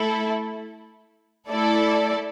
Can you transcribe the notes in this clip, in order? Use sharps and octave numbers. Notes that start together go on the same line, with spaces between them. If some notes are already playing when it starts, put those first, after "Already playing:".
Already playing: A3 E4 A4
A3 E4 A4 D5